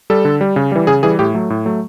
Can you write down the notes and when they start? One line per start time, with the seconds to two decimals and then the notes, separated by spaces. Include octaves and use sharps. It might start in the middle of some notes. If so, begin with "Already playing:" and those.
0.10 G3 A4
0.25 D3
0.41 G3
0.56 C#3
0.72 E3 G3
0.87 C#3 G#4
1.03 E3 G3 G#4
1.19 A2 G4
1.34 F#3 A3
1.50 A2
1.65 F#3 A3